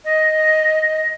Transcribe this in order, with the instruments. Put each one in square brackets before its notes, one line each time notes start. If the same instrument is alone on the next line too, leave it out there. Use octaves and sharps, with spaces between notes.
[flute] D#5